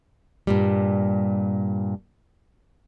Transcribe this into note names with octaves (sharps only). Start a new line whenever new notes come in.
G2 A#2 G3